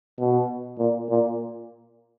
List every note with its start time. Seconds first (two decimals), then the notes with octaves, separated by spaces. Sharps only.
0.19 B2
0.78 A#2
1.09 A#2